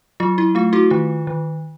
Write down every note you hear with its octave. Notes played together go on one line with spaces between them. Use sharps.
F#3 F4
E4
A3 F4
E4 F#4
D#3 F4
D#3